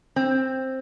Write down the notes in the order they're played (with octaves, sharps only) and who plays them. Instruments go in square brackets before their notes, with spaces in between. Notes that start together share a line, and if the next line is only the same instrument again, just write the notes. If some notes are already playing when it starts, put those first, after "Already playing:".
[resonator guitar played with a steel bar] C4